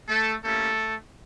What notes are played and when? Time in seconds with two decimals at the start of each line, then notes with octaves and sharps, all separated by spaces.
0.08 A3 A4
0.45 A3 A#3 C#4 E4 G4 A4